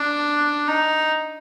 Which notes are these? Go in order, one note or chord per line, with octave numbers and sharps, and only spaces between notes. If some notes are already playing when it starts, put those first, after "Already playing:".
Already playing: D4
D#4